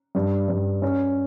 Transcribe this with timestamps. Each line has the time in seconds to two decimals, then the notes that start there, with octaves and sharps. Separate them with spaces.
0.15 G2
0.48 G2
0.82 C#4